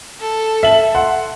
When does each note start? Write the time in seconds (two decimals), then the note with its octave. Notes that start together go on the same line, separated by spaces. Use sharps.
0.21 A4
0.63 E5 F#7
0.95 F#5 C6